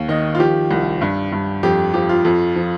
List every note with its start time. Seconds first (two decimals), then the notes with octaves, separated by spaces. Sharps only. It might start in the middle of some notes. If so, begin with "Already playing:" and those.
Already playing: D#2
0.08 D#3 D#5
0.35 F4
0.40 F3 G4
0.71 C2
1.01 G2
1.32 G2
1.63 F2 G4
1.94 F3 G4
2.09 F4
2.25 F2
2.56 F3